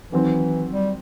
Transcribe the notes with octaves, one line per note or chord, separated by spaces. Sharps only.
D#3 E3 F#3 C4
G3